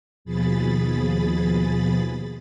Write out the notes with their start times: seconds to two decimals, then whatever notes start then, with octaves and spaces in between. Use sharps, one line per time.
0.25 D#2 B2 F3 G#4 B5 A6